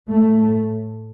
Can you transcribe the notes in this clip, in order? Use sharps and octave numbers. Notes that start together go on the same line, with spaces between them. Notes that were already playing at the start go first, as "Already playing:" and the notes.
A2 A3